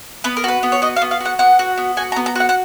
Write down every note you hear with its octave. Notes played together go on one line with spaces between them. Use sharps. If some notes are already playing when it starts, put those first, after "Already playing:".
B3 B4
A#4
F#4 B4
B3
C#5
F#4 D#5
F5
B3
F5
F#4 F#5
B3 F#5
F#4
B3
F#4 G#5
A#5
B3
A#5
F#4 F#5
F#5